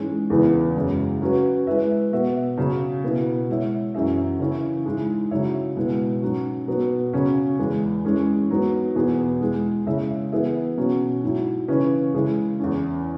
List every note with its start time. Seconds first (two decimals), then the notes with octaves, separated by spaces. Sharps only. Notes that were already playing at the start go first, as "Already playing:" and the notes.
Already playing: G#2 E3 G#3 C#4
0.30 E2 C#3 E3 B3 E4
0.75 F#2 C#3 G#3
1.21 F#3 C#4 F#4 B4
1.67 G#3 E4 B4 E5
2.12 B2 B3 F#4 E5
2.58 C#3 F#3 C#4
3.04 B2 B3 E4
3.49 G#3 E4 C#5 E5
3.94 F#2 E3 C#4 G#4 E5
4.39 C#3 E3 C#4 E4
4.85 G#2 G#3 E4
5.31 C#3 F#3 E4 C#5 E5
5.77 B2 G#3 E4 B4
6.22 G#2 F#3 C#4 F#4
6.67 B2 F#3 B3
7.13 C#3 F#3 C#4
7.59 E2 E3 G#3
8.05 E3 G#3 C#4 G#4
8.49 G#2 F#3 B3
8.95 E2 B2 B3 G#4
9.40 G#3 E4 G#4
9.87 C#3 G#3 E4 C#5 E5
10.32 E3 B3 G#4 E5
10.77 B2 F#3 C#4 F#4
11.23 G#2 F#3 E4
11.68 C#3 E3 C#4 G#4 B4
12.14 C#3 G#3 E4 G#4
12.59 E2 E3 C#4